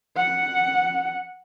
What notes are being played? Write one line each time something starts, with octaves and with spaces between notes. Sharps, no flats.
F#5